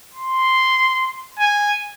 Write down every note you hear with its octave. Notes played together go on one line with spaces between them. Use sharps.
C6
G#5